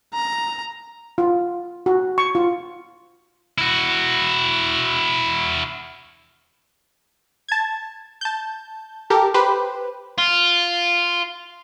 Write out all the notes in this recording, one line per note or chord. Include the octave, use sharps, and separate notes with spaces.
A#5
F4
F#4
C#6
F4
E4 F#4
A5 G#6
A5 G6
G4 A4 A#4
G4 B4 C5
F4